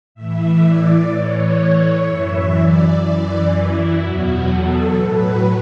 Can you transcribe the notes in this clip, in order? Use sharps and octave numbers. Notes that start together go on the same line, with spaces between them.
A2 E3 E5
D5
A2 E3 C#5
F#2 E3 E5
D5
F#2 E3 D5
E4
E2 B2 F#3 F#4
A4
A2 F#3 B4